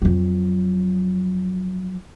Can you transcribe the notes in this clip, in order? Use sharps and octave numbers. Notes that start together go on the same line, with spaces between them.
F2 F#3